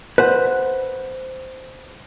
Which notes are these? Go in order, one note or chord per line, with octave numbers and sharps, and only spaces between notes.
B4 C5 F#5